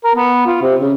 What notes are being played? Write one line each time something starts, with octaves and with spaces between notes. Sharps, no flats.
A#4
B3
F4
C3
C#3